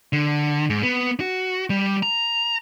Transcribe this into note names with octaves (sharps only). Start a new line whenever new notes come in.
D3
G#2
B3
F#4
G3
A#5